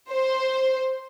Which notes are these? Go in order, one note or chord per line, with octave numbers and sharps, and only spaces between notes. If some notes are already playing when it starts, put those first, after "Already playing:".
C5